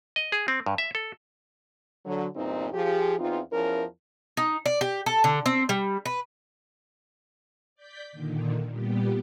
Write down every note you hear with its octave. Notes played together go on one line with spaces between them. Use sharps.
D#5
G#4
C4
G2
E5
A4
D3 F#3
E2 G2 A#2 C4 D#4
F3 G4 G#4
E2 E3 C4 D#4 F4
E2 E3 F3 C#4 A#4
D#4
D5
G4
A4
D3
C4
G3
B4
D5 G6 B6
A#2 D3 D#3
A#2 G3 B3 G4